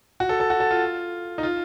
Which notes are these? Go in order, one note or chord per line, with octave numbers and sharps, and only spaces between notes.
F#4
A4
A4
F#4
A4
F4
D#4
F4